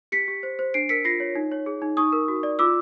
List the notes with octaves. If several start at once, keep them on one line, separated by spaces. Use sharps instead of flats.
G4 B6 C#7
G4
C5
C5
D4 C7 D7
A#4 B6 C#7
F4 A#6 C7
C#5
D#4
C#5
G#4
D#4
D#4 C#6 D#6
A#4
F#4
D5
F4 D6 E6